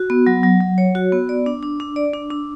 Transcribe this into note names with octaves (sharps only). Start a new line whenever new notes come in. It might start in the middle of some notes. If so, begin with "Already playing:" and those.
Already playing: F#4
B3
F#3
F#3
F#3
C#5
F#4
B3
D5
D4
D4
D4
D5
D4
D4